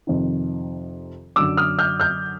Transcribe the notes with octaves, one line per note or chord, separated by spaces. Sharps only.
F2 C3 D#3
F#2 D3 F#3 D6 E6
D#6 F6
F6 G6
F6 G6